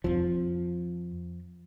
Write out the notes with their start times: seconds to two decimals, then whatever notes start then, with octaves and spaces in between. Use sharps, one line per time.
0.04 F2 F3 C4